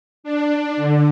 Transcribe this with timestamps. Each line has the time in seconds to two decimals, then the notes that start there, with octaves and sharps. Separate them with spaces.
0.24 D4
0.77 D3